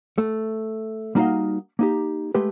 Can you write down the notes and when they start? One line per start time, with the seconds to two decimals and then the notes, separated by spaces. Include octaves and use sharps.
0.18 A3
1.15 G3 A#3 D#4 F#4 D#5 F5
1.79 A#3 D#4 G4
2.35 G#3 A3 G4 B4